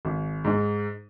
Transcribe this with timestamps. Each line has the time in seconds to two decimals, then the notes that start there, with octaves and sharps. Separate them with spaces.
0.05 G#1
0.44 G#2 G#3 D#4